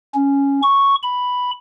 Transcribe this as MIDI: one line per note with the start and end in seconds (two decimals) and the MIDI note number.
0.14 0.60 61
0.63 0.95 85
1.03 1.51 83